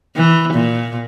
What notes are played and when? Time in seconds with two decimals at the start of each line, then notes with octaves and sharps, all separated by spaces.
0.16 E3
0.53 A#2